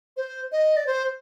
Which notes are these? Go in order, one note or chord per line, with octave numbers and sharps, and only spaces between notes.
C5
D#5
D5
C5